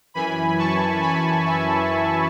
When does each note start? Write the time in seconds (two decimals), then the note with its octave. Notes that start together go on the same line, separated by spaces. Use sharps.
0.14 F#2 E3 G#5 B5
0.58 A5 C#6
1.02 G#5 B5
1.46 E5 G#5